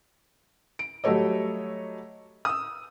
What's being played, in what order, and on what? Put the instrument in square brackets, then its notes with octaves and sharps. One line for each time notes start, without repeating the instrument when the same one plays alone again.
[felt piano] D7
F#3 G3 A3 A4 C#5 D#5
D#6 E6